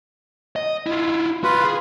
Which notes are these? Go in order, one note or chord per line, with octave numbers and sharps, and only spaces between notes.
D#5
E4 F4
F4 F#4 B4 F5
G#4